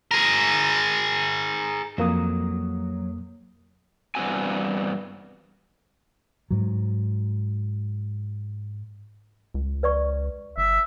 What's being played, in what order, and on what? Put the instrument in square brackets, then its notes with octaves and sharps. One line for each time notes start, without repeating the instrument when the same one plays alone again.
[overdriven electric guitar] G#4 A#4
[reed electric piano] F2 A#3 D#6 [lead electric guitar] F#3
[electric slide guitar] E2 G2 A#2 C4 F#4 G#5
[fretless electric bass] G#2 F#3
[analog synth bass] C#2
[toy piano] B4 D5 C#6
[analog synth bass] G1 [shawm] E5